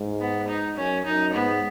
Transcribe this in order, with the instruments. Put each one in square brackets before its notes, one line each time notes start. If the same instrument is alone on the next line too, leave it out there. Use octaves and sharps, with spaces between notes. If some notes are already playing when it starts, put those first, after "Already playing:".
Already playing: [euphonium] G#2
[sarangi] B3
D#4
[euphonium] F#2 [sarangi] C#4
[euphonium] F#2 [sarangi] D#4
[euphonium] G#2 [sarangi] B3